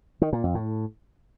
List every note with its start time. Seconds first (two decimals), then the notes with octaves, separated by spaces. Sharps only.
0.22 D#3
0.33 A#2
0.44 F2
0.55 A2